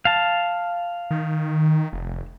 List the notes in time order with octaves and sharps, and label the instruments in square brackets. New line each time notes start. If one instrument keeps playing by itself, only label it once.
[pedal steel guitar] F5 A5
[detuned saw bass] D#3
F1